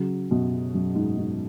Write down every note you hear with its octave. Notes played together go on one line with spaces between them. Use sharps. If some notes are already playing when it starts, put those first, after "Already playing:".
Already playing: C#3 F#3
F#2 B2
F#2
G#2
G#2